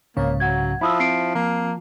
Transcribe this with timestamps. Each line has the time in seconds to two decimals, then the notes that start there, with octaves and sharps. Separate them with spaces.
0.17 C2 G#2 C#3 A#3 C#5
0.40 F#3 F#5 G#6
0.81 F3 E4 B5 D#6 E6
1.00 C4 C7 D7
1.35 F3 A#3